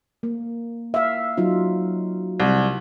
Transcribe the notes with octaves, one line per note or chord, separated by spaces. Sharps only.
A#3
E5 F5
F#3 D#4 F4
C2